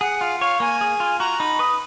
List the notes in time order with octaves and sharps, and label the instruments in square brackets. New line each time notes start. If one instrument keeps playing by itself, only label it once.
[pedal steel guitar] G#4 [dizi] F#5
[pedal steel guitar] F4 [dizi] F5
[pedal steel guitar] C#5 [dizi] F5
[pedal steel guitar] A#3 [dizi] G#5
[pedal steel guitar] G#4
F4
[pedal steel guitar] F#4 [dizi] A#5
[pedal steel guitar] D#4 [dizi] B5
[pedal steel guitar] B4 [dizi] D#6